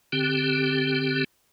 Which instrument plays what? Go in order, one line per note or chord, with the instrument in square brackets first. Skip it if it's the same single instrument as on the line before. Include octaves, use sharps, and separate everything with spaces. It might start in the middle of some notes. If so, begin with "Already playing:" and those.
[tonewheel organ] D3 C4 G4